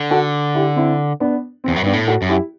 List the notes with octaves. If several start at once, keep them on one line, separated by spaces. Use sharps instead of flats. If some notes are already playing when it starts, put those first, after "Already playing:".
Already playing: D3
F#4 A4
E4 G4
C4 E4
B3 D4
C4
E2
F#2
G2 B3 D4
A2
F#4 A4
F#2
E4 G4